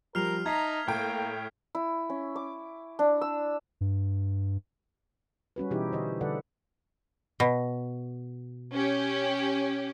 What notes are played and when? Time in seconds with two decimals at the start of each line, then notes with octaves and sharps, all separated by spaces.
0.15 F3 G3 A#4 F6 C7 F7
0.46 D#4 E5 A5 A#5 G#6 B6 C7
0.87 A2 A#3 G5
1.75 E4
2.09 C#4
2.36 D6
2.99 D4
3.21 E6
3.81 G2
5.56 G3 C#4 F#4 B4
5.71 B2 E3 D#4 E4 G4 G#4
5.92 D3 C5 D#5
6.21 D3 G3 A4 B4 D5 F#5
7.40 B2
8.74 C#4 G4